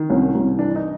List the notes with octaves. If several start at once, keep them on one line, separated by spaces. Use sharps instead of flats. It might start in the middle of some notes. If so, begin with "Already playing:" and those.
Already playing: D#3
C2 C#4
C2
E3 D4
D#4